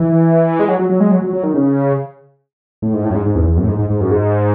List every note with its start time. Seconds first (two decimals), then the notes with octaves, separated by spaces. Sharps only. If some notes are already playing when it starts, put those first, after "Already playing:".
Already playing: E3
0.59 G#3
0.68 F#3
0.79 F#3
0.89 F#3
1.00 G#3
1.12 F#3
1.22 F#3
1.33 F#3
1.43 D#3
1.54 C#3
2.82 A2
2.94 G#2
3.04 A2
3.10 F#2
3.15 G#2
3.26 G#2
3.35 E2
3.47 E2
3.57 F#2
3.63 A2
3.68 G#2
3.79 G#2
3.90 G#2
4.01 F#2
4.11 G#2